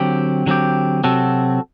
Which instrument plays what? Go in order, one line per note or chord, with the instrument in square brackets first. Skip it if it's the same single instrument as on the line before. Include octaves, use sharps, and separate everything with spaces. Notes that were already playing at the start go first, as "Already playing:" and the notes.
Already playing: [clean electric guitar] D3 F#3 C4 G4
D3 F#3 C4 G4
C3 F#3 C4 F#4 A4